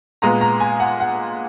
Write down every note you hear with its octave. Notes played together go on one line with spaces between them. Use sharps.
A#2 G#3 B3 A#5
A#5
G#5
F#5
F#5